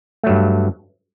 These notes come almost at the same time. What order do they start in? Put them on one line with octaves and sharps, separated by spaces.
A3 F#3 G2